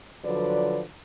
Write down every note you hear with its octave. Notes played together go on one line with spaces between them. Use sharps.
D3 F3 F#3 B4 D5